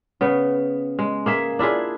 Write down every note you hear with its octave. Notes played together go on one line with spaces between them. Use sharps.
C#3 B3
G#3
A#3 G#4 E5
D4 E4 F4 G#4